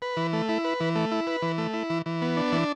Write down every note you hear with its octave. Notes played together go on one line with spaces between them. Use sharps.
B4
E3
A3
E4
B4
E3
A3
E4
B4
E3
A3
E4
E3
E3
B3
D4
E3